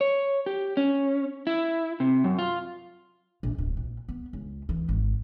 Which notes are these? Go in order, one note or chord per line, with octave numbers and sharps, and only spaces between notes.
C#5
G4
C#4
E4
C3
F#2
F4
A#1
D1
A#1
B3
C#2
E3
G#1